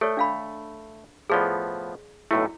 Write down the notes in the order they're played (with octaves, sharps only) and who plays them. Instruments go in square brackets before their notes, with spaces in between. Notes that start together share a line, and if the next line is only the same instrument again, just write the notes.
[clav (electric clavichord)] A3 [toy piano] A4 C#5 D5
[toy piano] D4 F5 B5
[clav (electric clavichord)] A2 F3 B3 [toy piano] G#4 D5
[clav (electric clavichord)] B1 A2 A3 [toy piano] E4